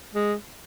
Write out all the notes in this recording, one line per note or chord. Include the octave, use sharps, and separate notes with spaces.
G#3